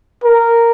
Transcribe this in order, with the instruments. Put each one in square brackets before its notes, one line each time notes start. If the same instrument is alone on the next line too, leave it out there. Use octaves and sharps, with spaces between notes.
[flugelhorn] A#4